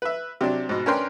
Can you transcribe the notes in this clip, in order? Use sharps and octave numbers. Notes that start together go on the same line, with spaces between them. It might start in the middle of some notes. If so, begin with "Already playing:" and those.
B4 E5
C3 F#3 D4
G#2 B2
C#4 D4 A#4 B4 G5 C6